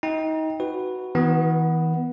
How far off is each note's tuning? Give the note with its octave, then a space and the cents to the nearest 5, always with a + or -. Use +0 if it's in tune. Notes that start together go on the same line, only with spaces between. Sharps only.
D#4 +30 G5 +10
F#4 +0 B4 +0
E3 -40 B3 +0